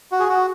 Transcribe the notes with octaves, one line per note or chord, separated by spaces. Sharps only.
F#4
G#4
F#4